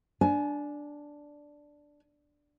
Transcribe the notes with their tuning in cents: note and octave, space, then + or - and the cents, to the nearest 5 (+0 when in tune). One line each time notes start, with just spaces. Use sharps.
D4 +0 G#5 +25